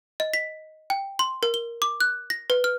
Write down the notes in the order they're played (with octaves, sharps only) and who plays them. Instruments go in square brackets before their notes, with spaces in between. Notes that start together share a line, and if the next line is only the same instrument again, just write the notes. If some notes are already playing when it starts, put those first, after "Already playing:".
[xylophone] D#5
B6
G5
C6
A#4
G7
D6
F#6
A#6
B4
F6